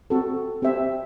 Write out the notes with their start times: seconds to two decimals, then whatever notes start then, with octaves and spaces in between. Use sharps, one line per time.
0.10 C4 F#4 A4
0.62 C4 G4 C5 E5